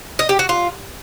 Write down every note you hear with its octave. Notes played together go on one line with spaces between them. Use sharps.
D#5
G4
F#4
F4